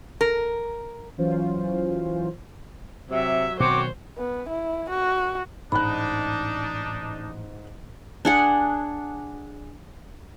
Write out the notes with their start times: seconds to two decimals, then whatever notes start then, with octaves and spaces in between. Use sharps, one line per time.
0.21 A#4
1.18 E3 F#3 C#4 F4 C5
3.10 C3 F#3 E5
3.60 B2 D#3 F#3 C4 F#4 C5 C#5 D6
4.17 B3
4.48 E4
4.89 F#4
5.72 A1 G#2 D4 D#4 B5 F#6
8.25 D4 G#4 F#5